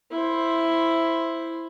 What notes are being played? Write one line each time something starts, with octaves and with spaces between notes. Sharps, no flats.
E4 C5